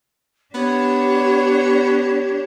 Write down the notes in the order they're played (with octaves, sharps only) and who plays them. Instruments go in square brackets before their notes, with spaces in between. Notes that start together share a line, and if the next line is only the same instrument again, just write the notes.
[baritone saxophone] B3 [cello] D4 G4 [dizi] C#5